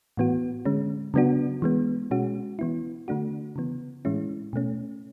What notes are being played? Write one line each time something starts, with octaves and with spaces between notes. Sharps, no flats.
A2 E3 B3 F#4
D3 G#3 C#4
C#3 F#3 B3 D4 F#4
E3 G#3 B3
B2 G#3 C#4 F#4
E3 B3 E4
D3 A3 D4 F#4
C#3 E3 B3
A2 E3 G#3 C#4 E4
B2 A3 C#4